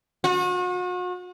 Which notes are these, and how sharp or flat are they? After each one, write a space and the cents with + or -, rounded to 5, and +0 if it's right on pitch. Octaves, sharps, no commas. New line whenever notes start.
F#4 -40